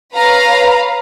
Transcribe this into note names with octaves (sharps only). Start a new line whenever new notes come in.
B4 C#5 F5 A#5 B5